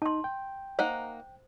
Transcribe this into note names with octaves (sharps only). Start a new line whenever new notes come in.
D#4 A5 C6
G5
A#3 D#4 C5 F#5